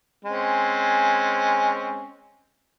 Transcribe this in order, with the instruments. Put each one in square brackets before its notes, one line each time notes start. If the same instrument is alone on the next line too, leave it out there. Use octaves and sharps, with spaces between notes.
[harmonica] G#3 C4 C#4